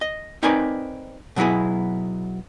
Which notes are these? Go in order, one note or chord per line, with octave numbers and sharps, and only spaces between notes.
D#5
C4 D#4 A#4 B4 D5 G#5
B2 F#3 B3 E4 G#4